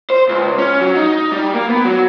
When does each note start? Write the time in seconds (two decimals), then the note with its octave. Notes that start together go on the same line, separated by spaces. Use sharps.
0.10 C5
0.29 C#2
0.58 C#4
0.80 F#3
0.96 D#4
1.32 G3
1.54 A#3
1.69 B3
1.84 F#3